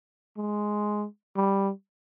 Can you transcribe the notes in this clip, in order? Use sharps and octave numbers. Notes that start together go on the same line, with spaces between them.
G#3
G3